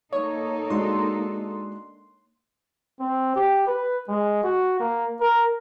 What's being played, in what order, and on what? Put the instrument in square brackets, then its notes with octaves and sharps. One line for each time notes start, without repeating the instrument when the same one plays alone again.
[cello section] A#3 D#4 A4 [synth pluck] C#5
[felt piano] G#3 D4 F#4 [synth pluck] C6
[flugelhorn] C4
G4
B4
G#3
F#4
A#3
A#4